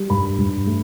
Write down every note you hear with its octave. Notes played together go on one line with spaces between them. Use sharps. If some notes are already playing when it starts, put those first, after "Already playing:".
Already playing: G3
G2 B5
G2
A3